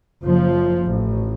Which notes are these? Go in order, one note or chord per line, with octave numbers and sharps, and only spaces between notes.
F#1 F3
A1